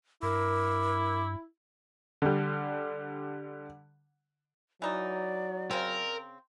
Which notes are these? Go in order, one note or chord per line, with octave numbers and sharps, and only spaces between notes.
G2 E4 A#4 D6
D3 G3
E3 F#3 D#4 D5
C#3 C4 A#4